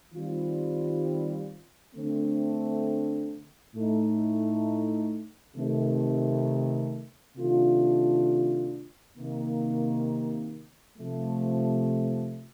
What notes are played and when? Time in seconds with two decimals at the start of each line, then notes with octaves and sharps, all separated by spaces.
0.14 D#3 G3 C4 F4
1.95 D3 A3 C4
3.75 A2 A3 D#4
5.56 C3 D#3 A3
7.37 C3 D#3 A3 D4 F4
9.18 C3 D#3 A#3
10.98 C3 F3 A3